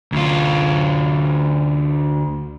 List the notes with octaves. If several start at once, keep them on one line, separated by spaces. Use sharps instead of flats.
D2 F4